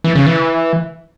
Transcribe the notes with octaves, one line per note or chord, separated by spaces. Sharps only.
E3
C#3
E3